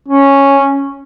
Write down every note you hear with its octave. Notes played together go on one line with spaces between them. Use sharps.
C#4